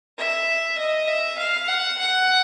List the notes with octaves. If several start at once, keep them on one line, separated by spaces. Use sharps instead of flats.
E5
D#5
E5
F5
F#5
F#5